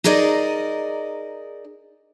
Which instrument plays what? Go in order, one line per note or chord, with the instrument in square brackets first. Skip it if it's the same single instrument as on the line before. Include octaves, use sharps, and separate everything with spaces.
[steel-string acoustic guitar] D#4 G#4 A#4 D5 D#5